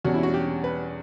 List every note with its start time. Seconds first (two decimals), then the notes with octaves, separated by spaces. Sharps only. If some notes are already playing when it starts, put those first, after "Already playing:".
0.04 E2 B2 G3 C#4 F#4
0.14 E4
0.23 F#4
0.34 G4
0.64 B4